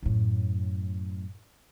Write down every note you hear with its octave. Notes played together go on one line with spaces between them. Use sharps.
F#2 A2